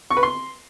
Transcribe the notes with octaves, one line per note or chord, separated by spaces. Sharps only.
C#6
B4
C6